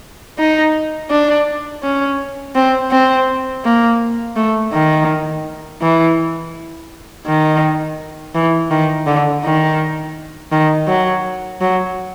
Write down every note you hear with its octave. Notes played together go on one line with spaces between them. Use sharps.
D#4
D4
C#4
C4
C4
A#3
A3
D#3
E3
D#3
E3
D#3
D3
D#3
D#3
F#3
F#3